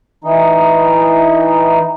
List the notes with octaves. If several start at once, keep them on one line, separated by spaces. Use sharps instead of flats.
E3 D#4